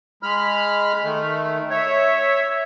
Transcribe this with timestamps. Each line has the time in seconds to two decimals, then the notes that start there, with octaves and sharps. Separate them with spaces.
0.23 G#3 B5 F6
1.03 D#3 A3
1.70 C#5 E5